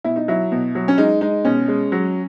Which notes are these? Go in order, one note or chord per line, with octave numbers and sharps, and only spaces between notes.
B2 E4
D#4
F#3 E4
B2
F#3
C#4
G#3 D#4
G#3 D#4
B2 C#4
G#3
F#3